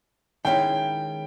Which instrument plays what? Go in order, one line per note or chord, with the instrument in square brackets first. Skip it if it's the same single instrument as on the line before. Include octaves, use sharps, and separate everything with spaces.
[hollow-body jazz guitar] D#3 G#3 C#4 E4 [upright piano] G5